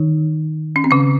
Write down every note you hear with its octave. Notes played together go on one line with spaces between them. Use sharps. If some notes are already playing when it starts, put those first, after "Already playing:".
Already playing: D#3 D#4
C#4
C4
C#3 C#4